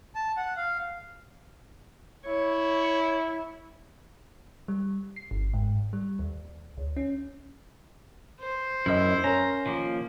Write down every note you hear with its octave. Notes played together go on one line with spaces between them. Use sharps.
A5
F#5
F5
E4 C#5
G3
C7
G1
G#2
G3
D#2
D2
C#4
C5
F#2 E4 D#5 E6
C#4 A#4 A#5
D#3 F3 A#3